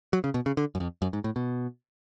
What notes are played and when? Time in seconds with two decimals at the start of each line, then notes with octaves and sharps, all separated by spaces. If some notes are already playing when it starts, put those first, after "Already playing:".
0.13 F#3
0.24 C#3
0.34 B2
0.46 C#3
0.57 D3
0.75 F#2
0.80 F2
1.02 F#2
1.13 G#2
1.24 A2
1.36 B2